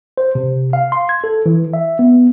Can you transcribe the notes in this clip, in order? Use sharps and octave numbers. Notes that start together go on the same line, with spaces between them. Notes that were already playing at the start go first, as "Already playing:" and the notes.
C5
C3
F5
C6
G#6
A4
E3
E5
B3